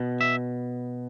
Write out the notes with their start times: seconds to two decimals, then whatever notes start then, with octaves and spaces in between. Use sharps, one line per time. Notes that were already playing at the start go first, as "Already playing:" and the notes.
Already playing: B2
0.21 E5